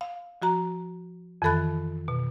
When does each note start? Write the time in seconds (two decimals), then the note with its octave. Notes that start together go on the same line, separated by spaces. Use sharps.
0.01 F5
0.42 F3 F#4 A#5
1.42 F2 D#3 E3 A4 B5 F#6
2.08 B2